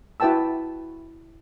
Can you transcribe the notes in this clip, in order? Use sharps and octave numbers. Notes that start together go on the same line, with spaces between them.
E4 F#4 B4 G5 A5 E6